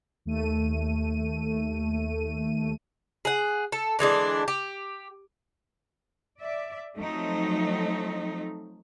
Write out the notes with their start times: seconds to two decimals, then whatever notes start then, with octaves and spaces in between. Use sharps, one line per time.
0.25 D#2 A3 D#7
3.25 G#4 F#5
3.72 A4
3.99 D3 E3 G#3 D4
4.48 G4
6.38 D5 E5
6.95 F3 F#3 A3 C4 D#4